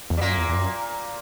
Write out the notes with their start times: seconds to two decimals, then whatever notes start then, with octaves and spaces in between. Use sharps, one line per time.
0.10 E2
0.17 G3
0.21 F#2 A#2 A#3
0.38 E2
0.49 E2
0.55 F#2